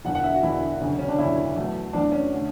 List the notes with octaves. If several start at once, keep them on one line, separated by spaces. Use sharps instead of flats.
E1 E2 D3 F#5
F#5
E5
F#4
E1 E2 D3 E4
E1 D2 C#3 F#3
C#4
D4
E1 D2 C#3 F#3 E4
E2 B2 F#3 A3
E2 B2 F#3 A3 D4
C#4
D3 A3